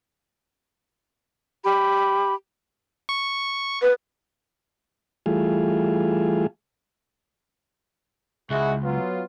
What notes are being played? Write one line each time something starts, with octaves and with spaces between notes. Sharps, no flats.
G4 B5
C#6
B4
E3 G3 A3 F4 G#4
C#2 G#3 E4 F#4
F#3 B3 F4